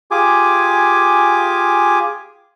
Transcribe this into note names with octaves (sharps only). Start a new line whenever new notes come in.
F4 G4 G#4 G#5 D6